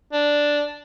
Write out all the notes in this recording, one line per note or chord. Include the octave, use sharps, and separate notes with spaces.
D4